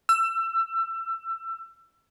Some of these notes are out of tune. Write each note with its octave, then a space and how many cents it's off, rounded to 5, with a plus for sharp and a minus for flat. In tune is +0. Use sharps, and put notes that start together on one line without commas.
E6 +25